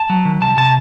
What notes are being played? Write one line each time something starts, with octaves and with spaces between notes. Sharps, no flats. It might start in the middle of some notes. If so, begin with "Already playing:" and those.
Already playing: A5
F#3
D#3
C2 A5
C3 A5